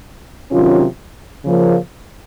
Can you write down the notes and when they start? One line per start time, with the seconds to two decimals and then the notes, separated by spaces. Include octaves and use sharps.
0.51 C3 D#3 F#3 C#4 F4
1.44 C#3 F3 A#3